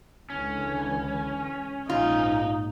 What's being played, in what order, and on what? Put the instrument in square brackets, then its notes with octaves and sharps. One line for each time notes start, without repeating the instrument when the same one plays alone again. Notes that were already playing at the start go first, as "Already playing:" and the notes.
[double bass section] C#2 D3 E3 [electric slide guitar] C#4
[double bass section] A#1 G#2 [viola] D#4 [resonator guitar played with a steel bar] F4